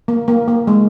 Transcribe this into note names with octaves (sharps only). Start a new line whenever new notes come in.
A#3
A#3
A#3
G#3